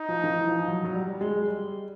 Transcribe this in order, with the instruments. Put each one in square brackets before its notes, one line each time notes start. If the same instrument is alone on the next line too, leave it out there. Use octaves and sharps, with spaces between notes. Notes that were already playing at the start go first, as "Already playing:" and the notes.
Already playing: [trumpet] D#4
[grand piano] F3
D#3
E3
F3
F#3
F#3
G3
G#3
G3